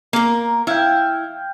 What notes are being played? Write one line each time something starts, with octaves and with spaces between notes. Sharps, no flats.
A#3 A#4
E4 F5 G5